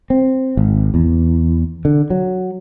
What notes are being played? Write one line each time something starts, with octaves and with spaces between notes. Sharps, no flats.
C4
G#1
E2
D3
F#3